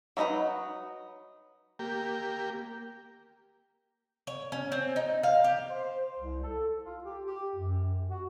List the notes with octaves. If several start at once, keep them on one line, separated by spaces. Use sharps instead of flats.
F#3 A3 D#4 B4 A#5
A#3 G4
C#5
C#4
C4
D#4
F5
G4
C5
C2
A4
F4
G4
G4
F#2
F#4